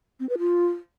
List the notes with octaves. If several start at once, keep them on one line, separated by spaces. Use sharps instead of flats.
C4
B4
F4